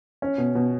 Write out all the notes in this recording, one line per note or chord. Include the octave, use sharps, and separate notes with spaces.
C#4
B2
B2